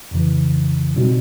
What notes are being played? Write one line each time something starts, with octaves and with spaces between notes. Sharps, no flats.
F2 C#3 E3
B2 G3 C4 D#4 F#4